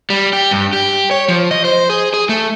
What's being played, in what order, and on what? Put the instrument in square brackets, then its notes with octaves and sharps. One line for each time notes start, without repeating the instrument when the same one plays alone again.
[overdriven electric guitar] G3
G4
G2
G4
C#5
F3
D#5
C5
G#4
G#4
A3